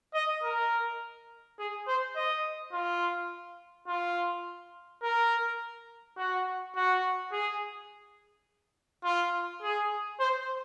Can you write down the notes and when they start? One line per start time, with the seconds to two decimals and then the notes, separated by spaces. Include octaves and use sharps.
0.14 D#5
0.44 A#4
1.59 G#4
1.88 C5
2.16 D#5
2.73 F4
3.88 F4
5.03 A#4
6.17 F#4
6.76 F#4
7.32 G#4
9.05 F4
9.63 G#4
10.20 C5